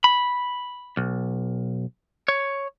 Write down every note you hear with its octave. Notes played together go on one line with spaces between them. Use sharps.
B5
B1
C#5